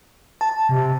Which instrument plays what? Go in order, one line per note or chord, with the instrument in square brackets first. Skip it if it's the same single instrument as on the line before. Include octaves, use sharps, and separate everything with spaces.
[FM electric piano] A5
[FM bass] C3